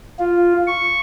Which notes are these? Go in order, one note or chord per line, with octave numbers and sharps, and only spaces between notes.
F4
C#6